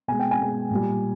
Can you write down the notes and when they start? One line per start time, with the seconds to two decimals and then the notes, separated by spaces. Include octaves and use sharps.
0.08 B2 G#3 G#5
0.20 G5
0.31 G#5
0.39 B2 G#3
0.70 A#2 G3